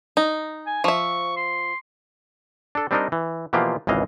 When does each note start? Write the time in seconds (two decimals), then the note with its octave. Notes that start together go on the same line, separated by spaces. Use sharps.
0.17 D#4
0.66 G#5
0.84 F3 E5 C#6
1.37 C6
2.75 D4 A4
2.91 G3 C4 D4 D#4 A#4 D#5
3.12 E3
3.53 B2 E3 F3 A#3 F4 G4
3.87 G#1 C#2 E3 D#5 F5